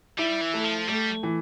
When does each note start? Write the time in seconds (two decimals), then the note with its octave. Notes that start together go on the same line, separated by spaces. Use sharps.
0.18 G3 E4
0.41 E3
0.54 A3
0.65 F3
0.88 G3 A3
1.23 E3